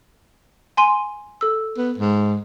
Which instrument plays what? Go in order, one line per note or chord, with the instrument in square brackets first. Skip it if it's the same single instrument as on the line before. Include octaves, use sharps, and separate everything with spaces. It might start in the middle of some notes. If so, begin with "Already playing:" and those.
[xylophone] G#5 C6 D#7
A4 E6
[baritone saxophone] B3
G#2